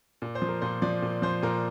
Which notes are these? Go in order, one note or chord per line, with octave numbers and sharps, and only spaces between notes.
A#2
C5
F3
A#4
A#2 C5
F3 D5
A#2
F3 C5
A#2 A#4